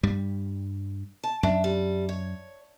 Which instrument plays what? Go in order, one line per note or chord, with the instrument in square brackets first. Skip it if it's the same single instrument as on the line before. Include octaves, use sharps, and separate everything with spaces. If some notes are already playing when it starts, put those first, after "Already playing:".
[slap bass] G2 G3
[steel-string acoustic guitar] A5
[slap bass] F#2 [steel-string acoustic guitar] D4 E5
[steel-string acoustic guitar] G3
C#5